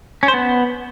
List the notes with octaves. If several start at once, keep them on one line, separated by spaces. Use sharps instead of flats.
C#4
C5
B3